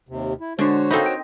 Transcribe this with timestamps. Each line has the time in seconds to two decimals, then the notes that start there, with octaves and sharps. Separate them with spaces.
0.09 D#2 C3
0.41 E4
0.59 D3 G#3 D4 F#4 C5 C#5
0.91 C4 D#4 A4 F5 B5
1.06 G5